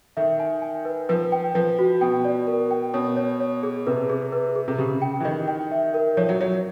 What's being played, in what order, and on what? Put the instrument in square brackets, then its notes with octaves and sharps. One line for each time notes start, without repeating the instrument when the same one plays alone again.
[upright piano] D#3 [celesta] E5
[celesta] G#5
G#5
B4
[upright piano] F3 [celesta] B4
[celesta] G5
[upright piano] F3 [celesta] B4
[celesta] F#4
[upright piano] B2 [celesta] G5
[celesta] D5
A#4
G5
[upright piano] B2 [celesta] C#5
[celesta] C#5
C#5
G#4
[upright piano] C3 [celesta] B4
[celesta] G#4
B4
G#4
[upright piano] C3
[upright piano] C#3 [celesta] G4
[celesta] G5
[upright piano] E3
[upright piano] D#3 [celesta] D#5
[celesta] G5
E5
A#4
[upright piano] F3 [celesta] C#5
[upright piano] F#3
[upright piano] F#3 [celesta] C#5